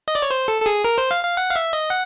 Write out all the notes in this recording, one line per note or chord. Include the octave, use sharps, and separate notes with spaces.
D#5
D5
C#5
C5
A4
A4
G#4
A#4
C5
F5
F5
F#5
F5
E5
D#5
F#5